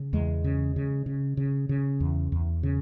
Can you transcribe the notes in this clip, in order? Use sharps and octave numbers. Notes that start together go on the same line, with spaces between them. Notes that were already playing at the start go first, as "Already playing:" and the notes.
Already playing: C#3
E2 G#3
C#3
C#3
C#3
C#3
C#3
E2
E2
C#3